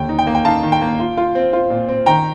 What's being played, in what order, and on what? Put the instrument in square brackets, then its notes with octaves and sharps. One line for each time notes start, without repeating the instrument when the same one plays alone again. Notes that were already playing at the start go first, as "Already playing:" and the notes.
Already playing: [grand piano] D#2 D3 G5
D#4
G5
A#3
G5
D#4 F5 A5
D#3
G5
A#3
F4
F4
C4
F4
A#2
C4
D#3 G5 A#5